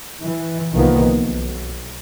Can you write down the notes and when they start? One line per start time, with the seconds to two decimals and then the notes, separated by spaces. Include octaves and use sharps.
0.23 E3
0.73 C2 D#3 F3 A#3 B3
1.13 B1